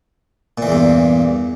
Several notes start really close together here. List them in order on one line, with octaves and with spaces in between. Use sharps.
A#2 E3 E2 G2